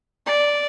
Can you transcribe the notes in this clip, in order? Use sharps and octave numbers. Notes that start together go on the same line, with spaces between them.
D5